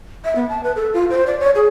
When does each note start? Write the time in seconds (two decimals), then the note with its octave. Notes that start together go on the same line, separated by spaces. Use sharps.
0.24 E5
0.36 B3
0.49 A5
0.63 B4
0.76 A4
0.94 F4
1.10 C5
1.27 D5
1.40 C#5
1.55 G#4